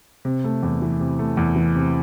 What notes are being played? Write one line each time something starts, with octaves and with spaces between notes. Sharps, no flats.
C3
A3
E2
E3
C3
A3
E2
E3
C3